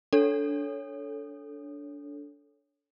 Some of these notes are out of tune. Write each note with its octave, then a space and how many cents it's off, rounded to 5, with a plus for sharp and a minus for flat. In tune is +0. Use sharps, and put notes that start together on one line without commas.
D4 -20 A4 +0 C#5 +5